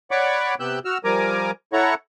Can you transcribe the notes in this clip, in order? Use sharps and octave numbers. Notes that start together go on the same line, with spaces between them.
C#5 D5 F#5 B5 C#6 D6
C3 B3 G4 E6 F#6 G6
F#4 E6 F6
F3 G3 A#4 G#5 A#5 D6
E4 A4 C#5 F#5 A#5 C#6